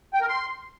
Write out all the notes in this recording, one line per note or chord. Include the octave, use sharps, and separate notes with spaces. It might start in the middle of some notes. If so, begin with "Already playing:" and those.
G5
A#4
C6